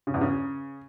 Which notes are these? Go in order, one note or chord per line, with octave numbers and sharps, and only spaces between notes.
C#3
E2
C#3